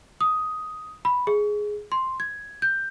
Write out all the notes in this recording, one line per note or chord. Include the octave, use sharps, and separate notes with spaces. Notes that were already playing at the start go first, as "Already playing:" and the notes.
D#6
B5
G#4
C6
G#6
G6